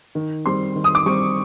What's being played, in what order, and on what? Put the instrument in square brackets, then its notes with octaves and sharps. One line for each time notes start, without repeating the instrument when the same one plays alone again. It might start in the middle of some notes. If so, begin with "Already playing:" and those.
[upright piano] D#3
G3 C4 C6
D#3
D#6
D6
G3 C4 C#6